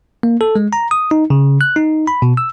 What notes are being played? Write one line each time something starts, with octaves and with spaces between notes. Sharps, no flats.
A#3
A4
G#3
A#5
D#6
D#4
C#3
F#6
D#4
B5
B2
E6